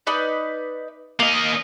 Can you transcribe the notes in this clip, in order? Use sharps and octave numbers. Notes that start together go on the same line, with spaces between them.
D#4 B4 D5
A#3 D#5 F5